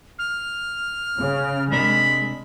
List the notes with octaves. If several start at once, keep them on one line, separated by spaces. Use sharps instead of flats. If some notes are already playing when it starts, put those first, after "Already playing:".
F6
C#3
C3 G#3 D4 A#4 B5